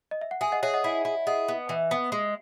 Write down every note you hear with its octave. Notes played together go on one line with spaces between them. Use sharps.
D#5
E5
F#5
G#4 E5 G#5
D#5 F#5
G#4 C#5 E5
D#5 F#5
E4
E4
G#4 D#5 F#5
B3
E3
B3
G#3